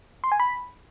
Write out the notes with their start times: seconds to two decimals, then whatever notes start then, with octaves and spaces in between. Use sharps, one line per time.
0.24 C6
0.32 G#5
0.40 B5